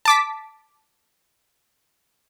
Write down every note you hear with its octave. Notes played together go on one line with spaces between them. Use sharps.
A5 D6 B6